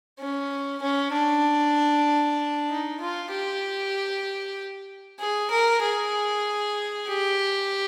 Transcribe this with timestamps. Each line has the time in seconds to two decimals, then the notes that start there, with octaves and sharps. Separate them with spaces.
0.19 C#4
0.82 C#4
1.13 D4
2.70 D#4
3.01 F4
3.32 G4
5.20 G#4
5.51 A#4
5.83 G#4
7.08 G4